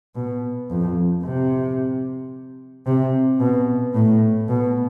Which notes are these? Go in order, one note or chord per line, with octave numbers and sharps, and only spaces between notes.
B2
F2
C3
C3
B2
A2
B2